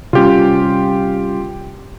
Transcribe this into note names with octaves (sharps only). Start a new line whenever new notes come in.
C3 G3 C#4 F4 G4